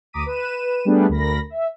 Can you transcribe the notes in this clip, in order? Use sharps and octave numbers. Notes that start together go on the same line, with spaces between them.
D2 A#5 D6 D#6 B6 D#7
B4 D#7 E7
G3 A3 B3 D4 G#4 B4
D2 A#4 B5 A#6
E5